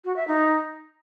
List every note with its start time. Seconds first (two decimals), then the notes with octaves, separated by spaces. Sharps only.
0.05 F#4
0.16 E5
0.28 D#4